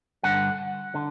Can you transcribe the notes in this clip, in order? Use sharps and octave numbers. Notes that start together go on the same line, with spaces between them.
G2 D3 F#5
D3